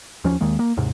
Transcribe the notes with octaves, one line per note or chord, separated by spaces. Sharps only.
D#2 F3 C#4
D#2 D#3 G#3 A#3
A#3
D#2 G#2 C3